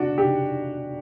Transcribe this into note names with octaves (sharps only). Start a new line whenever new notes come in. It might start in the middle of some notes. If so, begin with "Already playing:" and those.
Already playing: D4 F#4
G4